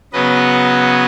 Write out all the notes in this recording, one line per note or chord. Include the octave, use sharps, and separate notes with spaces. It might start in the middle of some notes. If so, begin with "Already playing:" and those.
C#3 F#3 B3 B4 D#5